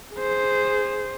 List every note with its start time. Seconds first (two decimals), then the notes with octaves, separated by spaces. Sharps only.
0.14 G#4 C5